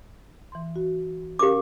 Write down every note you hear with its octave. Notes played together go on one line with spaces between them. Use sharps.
E3 C6
F#4
C#4 G4 A#4 F5 D6